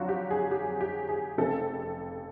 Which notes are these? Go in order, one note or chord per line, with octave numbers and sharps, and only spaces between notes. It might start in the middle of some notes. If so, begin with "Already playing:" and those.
Already playing: F2 D3 F#3 F4 F#4
G4
G#4
G4
G4
G#4
F1 F2 C#3 A4